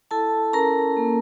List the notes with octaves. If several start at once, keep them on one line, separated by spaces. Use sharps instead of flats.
E4 A4 A5
C#4 A#4 A#5
A#3